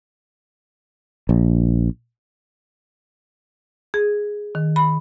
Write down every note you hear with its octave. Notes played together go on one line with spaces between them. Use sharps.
A#1
G#4
D#3
B5